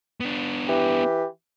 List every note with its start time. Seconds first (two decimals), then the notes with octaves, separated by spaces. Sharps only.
0.20 B3 D4
0.69 E3 G4